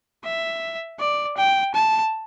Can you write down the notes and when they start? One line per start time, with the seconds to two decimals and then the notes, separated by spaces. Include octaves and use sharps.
0.24 E5
1.00 D5
1.37 G5
1.75 A5